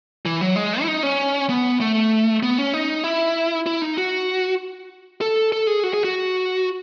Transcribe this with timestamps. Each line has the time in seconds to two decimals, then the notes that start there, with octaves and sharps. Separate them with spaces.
0.25 E3
0.41 F#3
0.56 G#3
0.82 E4
0.88 D#4
1.03 C#4
1.49 B3
1.81 A3
2.43 B3
2.58 C#4
2.74 D#4
3.04 E4
3.66 E4
3.82 D#4
3.97 F#4
5.21 A4
5.52 A4
5.67 G#4
5.83 F#4
5.94 G#4
6.04 F#4